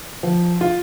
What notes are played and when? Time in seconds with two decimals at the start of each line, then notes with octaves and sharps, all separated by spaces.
0.23 F3
0.61 F4